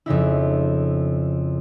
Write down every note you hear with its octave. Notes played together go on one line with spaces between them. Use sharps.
F2 C#3 D#4 E4